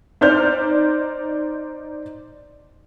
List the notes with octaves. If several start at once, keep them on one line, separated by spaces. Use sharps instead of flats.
D#4 C5 D5 F6 G6